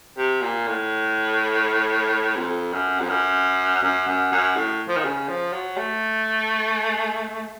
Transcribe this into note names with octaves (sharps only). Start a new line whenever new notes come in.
C3
A#2
A2
F2
F#2
F2
F#2
F#2
F#2
F#2
A2
F3
D#3
C#3
F3
F#3
A3